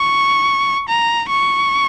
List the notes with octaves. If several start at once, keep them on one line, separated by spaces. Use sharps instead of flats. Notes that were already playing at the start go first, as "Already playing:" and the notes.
Already playing: C#6
A#5
C#6